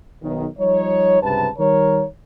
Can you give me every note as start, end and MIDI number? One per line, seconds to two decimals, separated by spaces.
0.23 0.46 35
0.23 0.46 51
0.59 1.21 53
0.59 1.21 55
0.59 1.21 63
0.59 1.21 73
1.23 1.49 37
1.23 1.49 43
1.23 1.49 48
1.23 1.49 71
1.23 1.49 81
1.58 2.04 51
1.58 2.04 55
1.58 2.04 70
1.58 2.04 73